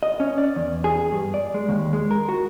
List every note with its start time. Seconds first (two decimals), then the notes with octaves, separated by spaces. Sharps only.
0.03 D#5
0.20 C#4
0.38 D5
0.56 E2
0.84 G#4
1.12 G2
1.34 D5
1.54 G#3
1.69 D#2
1.93 G#3
2.11 A#4
2.28 F#4